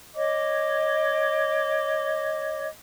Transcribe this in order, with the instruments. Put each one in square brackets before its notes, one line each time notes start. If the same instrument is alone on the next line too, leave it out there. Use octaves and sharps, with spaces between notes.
[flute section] C#5 D#5 D6